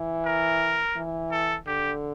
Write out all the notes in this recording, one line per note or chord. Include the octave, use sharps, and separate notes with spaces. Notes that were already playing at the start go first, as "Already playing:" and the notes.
Already playing: E3
A#4
E3
A4
D3 G4